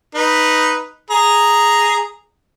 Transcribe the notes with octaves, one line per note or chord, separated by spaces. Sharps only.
D#4 B4
G#4 A#5